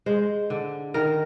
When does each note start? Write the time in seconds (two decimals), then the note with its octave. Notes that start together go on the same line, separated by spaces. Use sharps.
0.06 G#3 C5
0.50 D3
0.94 D#3 A#4